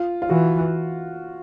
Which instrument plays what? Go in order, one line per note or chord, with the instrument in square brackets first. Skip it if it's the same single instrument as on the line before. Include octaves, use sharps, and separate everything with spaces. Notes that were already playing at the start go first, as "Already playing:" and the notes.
Already playing: [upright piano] F4
F4
[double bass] E3 [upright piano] F#4